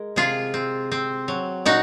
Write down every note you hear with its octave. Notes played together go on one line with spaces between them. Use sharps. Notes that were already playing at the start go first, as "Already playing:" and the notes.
Already playing: G#3 A#4
C3 F4 G#4
C4
C4
F#3
A#2 D#4 F#4